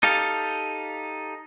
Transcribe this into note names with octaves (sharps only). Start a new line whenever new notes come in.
D#4 G4 A4 F5